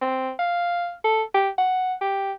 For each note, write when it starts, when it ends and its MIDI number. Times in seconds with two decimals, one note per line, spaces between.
0.01 0.32 60
0.39 0.94 77
1.04 1.23 69
1.35 1.49 67
1.58 1.94 78
2.01 2.33 67